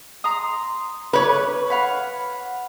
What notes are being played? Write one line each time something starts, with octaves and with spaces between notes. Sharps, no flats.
A#5 C6 D#6
B4 C#5 D6
F5 F#5 B5